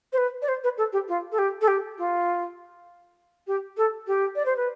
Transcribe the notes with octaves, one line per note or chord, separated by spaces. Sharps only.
C5
B4
D5
C5
B4
A4
G4
F4
A4
G4
A4
G4
F4
G4
A4
G4
D5
C5
B4